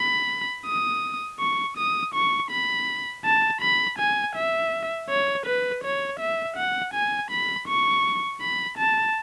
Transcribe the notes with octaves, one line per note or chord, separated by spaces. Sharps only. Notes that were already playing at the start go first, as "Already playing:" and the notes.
Already playing: B5
D#6
C#6
D#6
C#6
B5
A5
B5
G#5
E5
C#5
B4
C#5
E5
F#5
G#5
B5
C#6
B5
A5